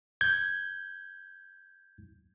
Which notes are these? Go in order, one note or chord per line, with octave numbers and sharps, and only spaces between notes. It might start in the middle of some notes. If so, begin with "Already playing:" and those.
G6 G#6